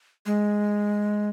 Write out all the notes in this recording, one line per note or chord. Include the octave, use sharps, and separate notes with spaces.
G#3